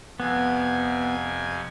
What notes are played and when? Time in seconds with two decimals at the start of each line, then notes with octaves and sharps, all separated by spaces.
0.20 F2 C3 B3 G#5